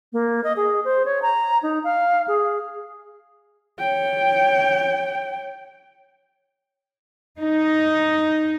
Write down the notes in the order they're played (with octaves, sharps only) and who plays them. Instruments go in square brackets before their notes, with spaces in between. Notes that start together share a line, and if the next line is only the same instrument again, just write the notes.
[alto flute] A#3
D#5
G#4
C5
C#5
A#5
D#4
F5
G#4
[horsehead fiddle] C#5 G5
[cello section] D#4